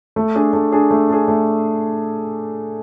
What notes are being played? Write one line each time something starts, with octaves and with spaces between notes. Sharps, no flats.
A3
D4 G#4
A3
D4 G#4
A3
D4 G#4
A3